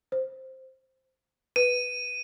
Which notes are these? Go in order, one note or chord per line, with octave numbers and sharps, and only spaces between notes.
C5
B4 D#7